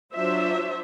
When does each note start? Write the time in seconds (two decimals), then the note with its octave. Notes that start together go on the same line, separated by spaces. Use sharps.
0.14 F#3 D4 F4 C5 E5